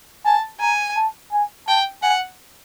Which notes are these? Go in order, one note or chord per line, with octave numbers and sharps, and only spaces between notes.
G#5 A5
G#5 A#5
A5
G#5
G5 A5
F#5 G#5